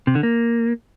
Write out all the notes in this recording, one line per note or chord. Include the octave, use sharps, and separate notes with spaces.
C3
D3
A#3